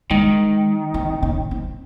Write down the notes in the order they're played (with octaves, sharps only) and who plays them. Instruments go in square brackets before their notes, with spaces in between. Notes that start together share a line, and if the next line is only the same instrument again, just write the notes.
[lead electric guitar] D#3 [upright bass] G#3
[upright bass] C4
C#4
C4